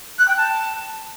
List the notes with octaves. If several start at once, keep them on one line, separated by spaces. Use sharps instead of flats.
F#6
G5
A5